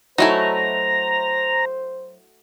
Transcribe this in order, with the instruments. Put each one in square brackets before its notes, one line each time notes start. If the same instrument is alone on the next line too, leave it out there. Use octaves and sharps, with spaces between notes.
[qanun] F#3 A3 [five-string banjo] D#4 E4 G#5 [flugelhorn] C5 [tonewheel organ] A#5